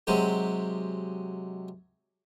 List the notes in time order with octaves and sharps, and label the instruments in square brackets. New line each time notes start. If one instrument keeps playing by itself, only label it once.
[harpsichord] C3 F#3 G#3 G4